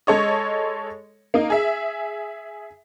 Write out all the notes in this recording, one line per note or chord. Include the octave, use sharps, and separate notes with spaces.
G#3 A4 C#5 D#5
A#3 D#4
G#4 E5